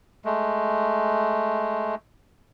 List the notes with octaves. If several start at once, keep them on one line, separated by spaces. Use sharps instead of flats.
G#3 A3